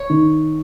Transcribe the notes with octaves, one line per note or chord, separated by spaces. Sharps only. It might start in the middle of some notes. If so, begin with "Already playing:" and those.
Already playing: C#5
D#3